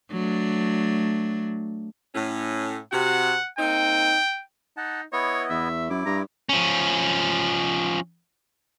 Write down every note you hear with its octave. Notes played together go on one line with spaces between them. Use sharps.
F#3 A3 D4
A2 C#4
C3 F#4 F#5
A#3 C4 D#4 G5
D#4 F#5 A5
B3 E4 C#5 D#5
E2 E5
F#2 E4 D6
G2 A#5
F3 C#4